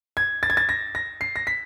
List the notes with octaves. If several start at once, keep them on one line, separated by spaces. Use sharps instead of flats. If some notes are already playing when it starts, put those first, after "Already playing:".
G#6
A6
G#6
A6
A#6
A#6
C7
A#6
B6